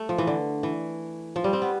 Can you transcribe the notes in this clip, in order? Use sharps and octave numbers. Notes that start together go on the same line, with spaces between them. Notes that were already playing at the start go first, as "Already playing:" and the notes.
Already playing: A3
F3
E3
D3
E3
F3
G3
C4
B3